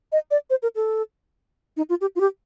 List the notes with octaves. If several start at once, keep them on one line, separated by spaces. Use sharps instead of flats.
D#5
D5
C5
A#4
A4
D#4
F4
G4
F4
G4